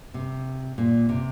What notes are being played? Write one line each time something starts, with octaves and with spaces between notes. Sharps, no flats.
C3
A#2
C3